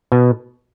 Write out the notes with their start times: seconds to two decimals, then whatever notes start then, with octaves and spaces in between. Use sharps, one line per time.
0.12 B2